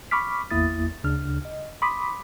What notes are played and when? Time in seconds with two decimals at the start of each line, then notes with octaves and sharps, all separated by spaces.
0.11 B5 C#6 D6 F6 B6
0.51 G#1 E2 A#3 E4 D#6 A6
1.04 D2 C#3 D4 F6
1.45 D#5
1.82 B5 C6 D6 D#6 B6